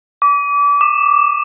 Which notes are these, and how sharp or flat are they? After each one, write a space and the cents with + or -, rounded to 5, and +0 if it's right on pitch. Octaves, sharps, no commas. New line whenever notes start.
D6 -35
D6 +25